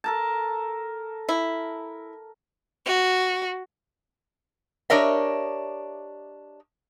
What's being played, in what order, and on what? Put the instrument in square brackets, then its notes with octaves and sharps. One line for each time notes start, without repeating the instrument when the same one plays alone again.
[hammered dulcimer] A4 A#4 A5
[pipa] E4
[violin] F#4
[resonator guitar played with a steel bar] D4 G4 A#4 C#5 D#5 E5